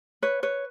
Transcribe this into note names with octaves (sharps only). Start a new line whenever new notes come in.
B4 C#5
B4 C#5